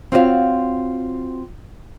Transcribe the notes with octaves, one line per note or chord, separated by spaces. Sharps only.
C4 F4 F#4 C#5 D#5 F5